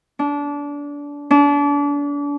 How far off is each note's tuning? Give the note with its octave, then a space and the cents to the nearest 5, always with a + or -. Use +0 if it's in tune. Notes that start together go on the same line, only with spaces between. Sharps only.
D4 -25
D4 -35